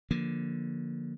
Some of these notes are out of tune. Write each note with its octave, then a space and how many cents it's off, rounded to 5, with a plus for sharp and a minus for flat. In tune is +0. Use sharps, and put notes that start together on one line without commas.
D3 +0 F3 +0 A#3 +15